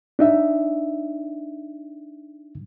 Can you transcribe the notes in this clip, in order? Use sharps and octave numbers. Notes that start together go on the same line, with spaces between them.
D4 D#4 E5